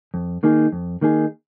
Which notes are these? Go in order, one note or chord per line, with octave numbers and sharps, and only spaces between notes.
F2
D#3 A#3 D#4 G#4
F2
D#3 A#3 D#4 G#4